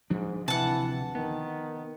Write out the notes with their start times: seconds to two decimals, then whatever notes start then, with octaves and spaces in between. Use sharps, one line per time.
0.10 D1 G#2 F3 D4
0.48 C3 E3 F#5 A5
1.15 D#3 B3